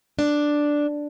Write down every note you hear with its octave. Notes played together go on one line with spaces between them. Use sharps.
D4